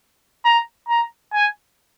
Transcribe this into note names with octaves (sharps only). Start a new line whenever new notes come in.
A#5
A#5
G#5